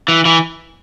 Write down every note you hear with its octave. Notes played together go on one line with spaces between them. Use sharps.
E3
E3